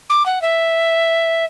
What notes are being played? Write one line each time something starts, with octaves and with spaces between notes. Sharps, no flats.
D6
F#5
E5